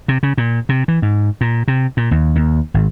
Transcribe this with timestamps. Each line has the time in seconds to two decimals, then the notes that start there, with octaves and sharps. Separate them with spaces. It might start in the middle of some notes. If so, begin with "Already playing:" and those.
0.08 C3
0.23 C#3
0.38 A#2
0.69 C3
0.88 E3
1.02 G#2
1.41 A#2
1.68 C3
1.97 A#2
2.11 D#2
2.36 D#2
2.74 G#1